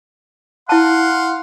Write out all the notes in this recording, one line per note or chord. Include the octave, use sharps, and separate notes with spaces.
E4 F5 F#5 A5 C6